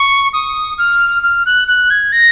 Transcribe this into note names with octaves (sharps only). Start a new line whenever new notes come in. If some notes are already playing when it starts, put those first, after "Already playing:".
Already playing: C#6
D#6
F6
F6
F#6
F#6
G#6
A#6